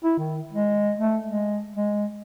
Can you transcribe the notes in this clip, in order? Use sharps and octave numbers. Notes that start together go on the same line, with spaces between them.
E4
D#3
G#3
A3
G#3
G#3